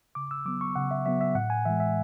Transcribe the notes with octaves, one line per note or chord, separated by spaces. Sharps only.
C#3 D6
E6
F#3 B3 D6
C#6
C#3 F#5
E5
F#3 B3 E5
E5
A2 F#5
G#5
E3 G#3 E5
E5